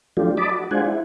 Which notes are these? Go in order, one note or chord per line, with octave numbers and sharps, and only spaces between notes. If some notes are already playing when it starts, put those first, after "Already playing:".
F3 F#3 A3 D4 F4 G4
D5 D#5 A5 B5 D6
F#4
G#3 D4 F4 C5 F#5 G#5
E4